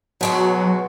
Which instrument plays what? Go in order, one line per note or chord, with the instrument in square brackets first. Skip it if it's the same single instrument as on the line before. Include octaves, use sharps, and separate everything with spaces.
[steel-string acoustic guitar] B2 G#3 F#4 [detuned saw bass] F#3